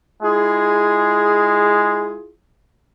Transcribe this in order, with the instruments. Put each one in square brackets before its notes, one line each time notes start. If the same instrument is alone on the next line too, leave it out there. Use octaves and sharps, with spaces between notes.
[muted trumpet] G#3 [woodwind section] E4 F4 G#4